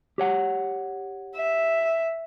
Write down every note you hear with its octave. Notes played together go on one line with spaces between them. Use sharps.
G4 C#5 F#5
E5